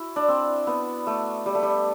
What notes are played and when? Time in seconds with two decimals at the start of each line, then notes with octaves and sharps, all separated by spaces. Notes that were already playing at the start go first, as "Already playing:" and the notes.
Already playing: E4 F#4
0.16 D4
0.28 C4
0.67 B3
1.07 A3
1.46 G3
1.55 A3
1.63 G3